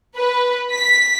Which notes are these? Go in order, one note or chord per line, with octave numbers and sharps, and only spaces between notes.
B4
B6